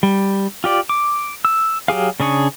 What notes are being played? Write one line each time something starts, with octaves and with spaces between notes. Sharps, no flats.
G3
F4 G4 D5
D6
E6
F#3 G4 G#4 F5
C#3 D4 G#4 C#5